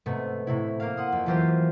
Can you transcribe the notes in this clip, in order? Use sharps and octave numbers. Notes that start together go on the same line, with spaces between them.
G#2 C3 A3 B3
A2 C3 E4
A#3 F5
F#5 C6 D#6
F2
E3 F#3 F4 G4 C5